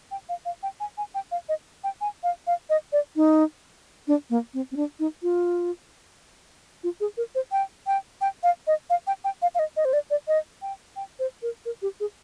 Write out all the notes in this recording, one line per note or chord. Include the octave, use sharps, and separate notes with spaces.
G5
F5
F5
G5
G#5
G#5
G5
F5
D#5
G5
G#5
F5
F5
D#5
D5
D#4
D4
A#3
C4
C4
D4
D#4
F4
F4
G#4
A#4
C5
G5
G5
G5
F5
D#5
F5
G5
G5
F5
F5
D#5
D#5
C5
D5
D5
D#5
G5
G5
C5
A#4
A#4
G4
G#4